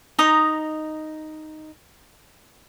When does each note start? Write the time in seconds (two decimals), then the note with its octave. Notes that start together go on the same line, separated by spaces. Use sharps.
0.19 D#4 A#5 D#6